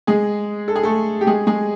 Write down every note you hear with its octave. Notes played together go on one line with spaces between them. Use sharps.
G#3 G#4
A4
G#4
A3 A4
G4
G#3 G#4
G#3 G#4